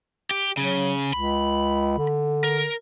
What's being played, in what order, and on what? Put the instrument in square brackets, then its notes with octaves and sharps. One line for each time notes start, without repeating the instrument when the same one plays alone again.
[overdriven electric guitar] G4
[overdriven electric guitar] C#3 [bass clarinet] F#3
[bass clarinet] C#2 [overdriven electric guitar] B5
[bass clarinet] D3
[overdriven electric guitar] A#4